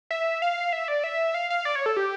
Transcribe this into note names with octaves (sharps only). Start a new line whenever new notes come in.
E5
F5
E5
D5
E5
F5
F5
D5
C#5
A4
G4